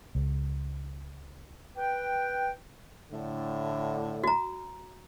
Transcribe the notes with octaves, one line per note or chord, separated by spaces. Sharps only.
C#2
B4 G5
A2 D3
F#4 A#5